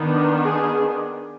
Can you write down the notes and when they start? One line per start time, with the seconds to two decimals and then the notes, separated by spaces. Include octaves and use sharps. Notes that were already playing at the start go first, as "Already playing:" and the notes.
Already playing: D#3 B3 D4
0.44 G#4